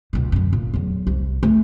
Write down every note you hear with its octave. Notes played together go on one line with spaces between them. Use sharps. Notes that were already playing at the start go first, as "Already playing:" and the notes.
C#2 B2
F#2 D3
A#2
E2 F#3
C2
A3